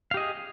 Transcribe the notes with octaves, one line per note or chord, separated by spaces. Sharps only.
G4 G#4 D#5 F5